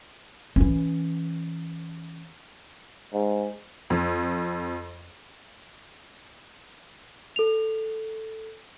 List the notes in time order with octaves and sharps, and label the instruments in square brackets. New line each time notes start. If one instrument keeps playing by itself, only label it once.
[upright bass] E3 C#4
[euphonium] G#2
[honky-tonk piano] F2
[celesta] A4 F7